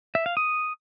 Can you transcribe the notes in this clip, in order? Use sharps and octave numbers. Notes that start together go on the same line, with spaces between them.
E5
F5
D#6